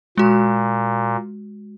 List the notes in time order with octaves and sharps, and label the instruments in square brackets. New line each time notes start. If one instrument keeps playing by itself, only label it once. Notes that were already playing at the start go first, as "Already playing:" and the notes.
[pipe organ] A#2 [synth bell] G#3 F#4